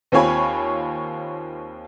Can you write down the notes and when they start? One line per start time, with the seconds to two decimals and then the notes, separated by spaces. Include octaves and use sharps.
0.12 D#2 C4 F4 C#5 G#5 B5